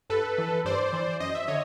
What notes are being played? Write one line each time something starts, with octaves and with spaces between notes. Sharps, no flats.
G2 A4 B4
E3
G2 C5 D5
E3
F#2 D#5
E5
D3 C#5 D#5